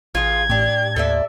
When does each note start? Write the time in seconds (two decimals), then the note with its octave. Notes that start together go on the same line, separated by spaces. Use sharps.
0.15 A1 F4 G#4 G#6
0.50 A2 D4 G4
0.96 D#2 A4 D5 E5